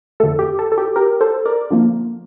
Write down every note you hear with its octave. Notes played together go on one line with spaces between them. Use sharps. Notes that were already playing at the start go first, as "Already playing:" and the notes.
F2 D3 A3 A4
G4
A4
A4
G4
G4 A#4
A4 C5
A#4 D5
D3 F3 A#3